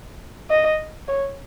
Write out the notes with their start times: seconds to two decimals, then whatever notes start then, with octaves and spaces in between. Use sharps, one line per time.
0.50 D#5
1.08 C#5